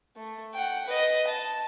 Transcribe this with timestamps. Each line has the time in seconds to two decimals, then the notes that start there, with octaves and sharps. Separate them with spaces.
0.16 A3
0.54 F#5 G5
0.86 B4 D#5
1.27 A5